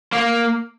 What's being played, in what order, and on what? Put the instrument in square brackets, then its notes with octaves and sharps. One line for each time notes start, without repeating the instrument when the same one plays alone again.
[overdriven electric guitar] A#3